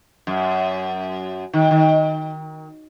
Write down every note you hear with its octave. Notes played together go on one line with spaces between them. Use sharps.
F#2
D#3
D#3